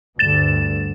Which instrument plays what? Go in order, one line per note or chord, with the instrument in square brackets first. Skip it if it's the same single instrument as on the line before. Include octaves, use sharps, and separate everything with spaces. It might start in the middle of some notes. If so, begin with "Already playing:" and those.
[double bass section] D2 G2 D3 [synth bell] A6 E7